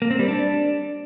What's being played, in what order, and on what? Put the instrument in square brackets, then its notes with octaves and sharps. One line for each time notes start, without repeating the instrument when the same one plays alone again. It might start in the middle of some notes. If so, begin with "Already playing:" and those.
[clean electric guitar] A#3
C4
G3
D4